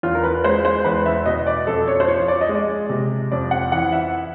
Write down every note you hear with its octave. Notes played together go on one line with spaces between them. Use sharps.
E2 F4
A#4
B4
G#3 C5
C5
E2 B4
E5
B2 D#5
D5
F2 A4
C#5
C5
F3 C#5
D5
D#5
G#3
D5
C3
F2 D5
F#5
E3 F#5
E5